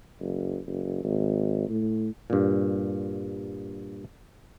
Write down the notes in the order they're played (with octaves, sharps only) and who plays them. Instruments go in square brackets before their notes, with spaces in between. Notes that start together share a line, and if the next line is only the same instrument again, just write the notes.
[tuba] F#1
F#1
G#1
A2
[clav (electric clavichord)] G2 A#2